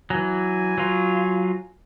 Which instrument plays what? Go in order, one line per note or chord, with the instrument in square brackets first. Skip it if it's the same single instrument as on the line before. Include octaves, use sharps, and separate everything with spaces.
[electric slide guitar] E3 F#3 [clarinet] G#5
[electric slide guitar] F#3 F4